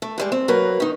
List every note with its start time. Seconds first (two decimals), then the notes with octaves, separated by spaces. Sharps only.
0.02 A3
0.18 G2 G3 G#3
0.32 C4
0.48 F#3 A#3 A#4 B4
0.80 D#3 D#4